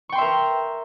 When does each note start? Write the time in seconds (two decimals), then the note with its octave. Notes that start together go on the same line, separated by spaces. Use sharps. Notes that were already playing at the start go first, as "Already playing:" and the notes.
0.09 C#6
0.12 G5
0.15 C6
0.18 E5
0.21 A#4